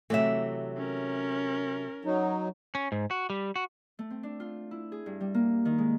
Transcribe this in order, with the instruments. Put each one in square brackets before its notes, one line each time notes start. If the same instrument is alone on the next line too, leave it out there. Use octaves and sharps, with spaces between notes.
[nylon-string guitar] C3 F#3 A3 [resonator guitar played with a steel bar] E3 E5
[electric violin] C#4 A#4
[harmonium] F#3 D#4
[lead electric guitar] C#4
G#2
F#4
G3
F#4
[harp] A3
C4
D4
F4
E4
G#4
G2
G3
A#3
D#3
G#3